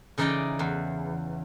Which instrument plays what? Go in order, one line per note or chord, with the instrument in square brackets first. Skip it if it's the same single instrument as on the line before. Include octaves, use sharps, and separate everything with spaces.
[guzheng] C#3 E3 D#4 D5 D#5 G5
E2